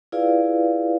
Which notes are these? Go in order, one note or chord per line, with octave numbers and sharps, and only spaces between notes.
E4 F4 G#4 B4 D5 F5